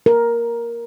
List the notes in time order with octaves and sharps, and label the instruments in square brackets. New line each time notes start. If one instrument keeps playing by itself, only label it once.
[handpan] A#4